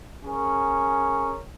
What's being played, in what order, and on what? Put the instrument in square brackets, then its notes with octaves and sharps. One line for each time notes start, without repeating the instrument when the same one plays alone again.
[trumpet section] C#4 G#4 A#4